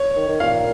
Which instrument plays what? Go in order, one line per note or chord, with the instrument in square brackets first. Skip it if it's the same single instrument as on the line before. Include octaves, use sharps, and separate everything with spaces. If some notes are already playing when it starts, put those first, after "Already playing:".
Already playing: [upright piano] C#5
[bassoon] D#3
D#3
[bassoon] A#2 [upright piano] F5